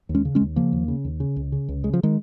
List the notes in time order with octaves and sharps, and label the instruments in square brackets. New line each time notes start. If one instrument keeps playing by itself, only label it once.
[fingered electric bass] D#2
G#3 C#4
C#3
G#3 C#4
D#2
C#3 F3 A#3
D#2
C#3
D#2
C#3
C#2
C#3
C#2
C#3 G#3
F3
D#3 G#3